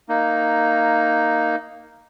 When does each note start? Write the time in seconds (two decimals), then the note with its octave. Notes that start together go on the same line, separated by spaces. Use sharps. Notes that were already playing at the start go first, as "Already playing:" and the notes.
0.09 A#3 D#4